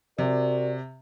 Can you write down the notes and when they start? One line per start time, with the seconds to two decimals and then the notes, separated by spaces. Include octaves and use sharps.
0.18 C3 F#4 A#4 D5